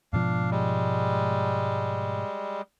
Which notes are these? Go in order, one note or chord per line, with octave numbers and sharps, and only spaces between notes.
G#2 B2 F3 D4 F5
G3 G#3